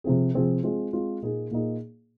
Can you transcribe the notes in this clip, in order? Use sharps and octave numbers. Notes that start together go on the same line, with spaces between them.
C3 F3 C4 G#4
C3 F3 C4 G#4
G#3 C4 F4
G#3 C4 F4
A#2 A#3 D#4 G#4
A#2 A#3 D#4 G#4